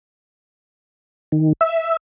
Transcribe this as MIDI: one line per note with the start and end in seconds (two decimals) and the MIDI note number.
1.32 1.53 51
1.61 1.97 76